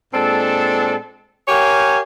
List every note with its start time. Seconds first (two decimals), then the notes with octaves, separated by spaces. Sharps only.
0.13 A#2 G#3 C4 D4 A4
1.48 G4 A#4 C#5 F5 G5 G#5